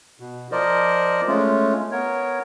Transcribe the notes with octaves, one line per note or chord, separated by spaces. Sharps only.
B2
F3 A#4 C5 D5 D#5
G#3 A3 C#4 F4
B3 A#4 C#5